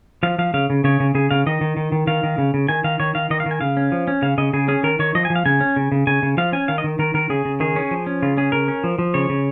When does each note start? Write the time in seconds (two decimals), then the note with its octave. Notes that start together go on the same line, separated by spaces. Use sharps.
0.23 F3 F5
0.39 F3 F5
0.54 C#3 F5
0.70 C#3
0.84 C#3 C#5
1.00 C#3
1.15 C#3 G#4
1.31 C#3 F5
1.46 D#3 D#5
1.61 D#3
1.77 D#3
1.92 D#3
2.07 D#3 F5
2.23 D#3
2.38 C#3
2.54 C#3
2.68 D#3 G#5
2.84 D#3 F5
3.00 D#3 C#5
3.15 D#3 F5
3.30 D#3 D#5
3.40 F5
3.46 D#3
3.51 G#5
3.61 C#3 F5
3.77 C#4
3.92 F3
4.08 C#4
4.22 C#3 F5
4.38 C#3 D#5
4.53 C#3 G#4
4.68 C#4 G#4
4.83 D#3 A#4
4.99 D#3 C#5
5.15 F3 D#5
5.25 G#5
5.30 F3
5.36 F5
5.46 C#3 G#5
5.61 C#4
5.76 C#3
5.92 C#3
6.07 C#3 G#5
6.23 C#3
6.37 F3 F5
6.52 C#4 G#5
6.68 D#3 F5
6.78 D#5
6.84 D#3
6.99 D#3 A#4
7.14 D#3 A#4
7.30 C#3 G#4
7.45 C#3
7.60 D#3 G#4
7.76 C#4
7.91 F3
8.07 C#4
8.22 C#3 F4
8.37 C#4 G#4
8.52 C#3 A#4
8.68 C#4
8.84 F3
8.99 F3
9.14 C#3 C#5
9.29 C#3